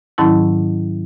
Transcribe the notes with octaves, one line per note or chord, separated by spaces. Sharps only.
G#2 D#3 F#3 C#4 E4 A5